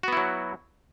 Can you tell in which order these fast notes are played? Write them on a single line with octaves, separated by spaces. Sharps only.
F#4 B3 E4 F#3